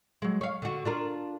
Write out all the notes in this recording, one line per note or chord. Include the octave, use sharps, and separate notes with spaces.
F#3 G#3
C#5 F5
D3 F#4
D4 F4 A#4